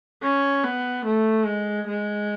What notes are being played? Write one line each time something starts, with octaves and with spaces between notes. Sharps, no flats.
C#4
B3
A3
G#3
G#3